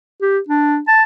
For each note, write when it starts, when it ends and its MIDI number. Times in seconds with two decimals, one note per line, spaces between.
0.21 0.38 67
0.49 0.79 62
0.88 1.03 81